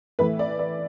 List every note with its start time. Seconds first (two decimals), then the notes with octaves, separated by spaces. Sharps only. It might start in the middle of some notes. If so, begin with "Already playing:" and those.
0.19 A2 E3 A3 B4
0.39 D5
0.59 D5